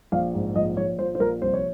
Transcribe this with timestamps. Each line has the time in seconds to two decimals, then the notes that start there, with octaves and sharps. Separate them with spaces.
0.12 A#1 F5
0.34 G#2
0.55 A#1 D#5
0.77 A#1 C#5
0.99 F3 C5
1.15 C5
1.20 A#1 A#4
1.42 C2 C5
1.54 C#5